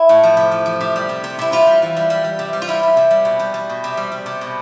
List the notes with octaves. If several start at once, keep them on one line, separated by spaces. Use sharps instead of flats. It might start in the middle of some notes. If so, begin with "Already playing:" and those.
Already playing: E4
A2
F3
C3
F3
F3
C3
G3
C3
C3
C3 E4
C3 F4
G3
E3
G3
G3
G3
C3
G3
F4
G3 E4
G3
C3
G3
B2
G3
G3
B2
C3
G3
G3
C3
B2